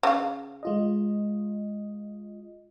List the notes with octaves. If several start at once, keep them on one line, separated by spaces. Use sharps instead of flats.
C#3 F5
G#3 F4 D#5